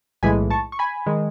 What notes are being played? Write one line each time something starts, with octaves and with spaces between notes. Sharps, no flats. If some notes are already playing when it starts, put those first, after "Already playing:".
B1 A2 E3 G#3 G#5 B5
A5 C#6
C#6
G#5 B5
D#3 G#3